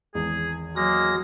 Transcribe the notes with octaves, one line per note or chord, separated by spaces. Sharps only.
G#1 E2 G#4
F#3 G#3 A#3 A#6